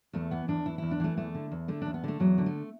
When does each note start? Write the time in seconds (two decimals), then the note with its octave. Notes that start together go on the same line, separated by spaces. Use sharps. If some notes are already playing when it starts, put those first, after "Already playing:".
0.13 E2 A3
0.31 E3 B3
0.48 E2 D4
0.66 E3 E4
0.78 E2 E4
0.91 D4
1.00 E3 A3
1.17 E2 A3
1.35 D3
1.52 E2
1.68 D3 A3
1.82 E2 D4
1.94 B3
2.04 D3 A3
2.20 E2 F#3
2.38 D3
2.46 A3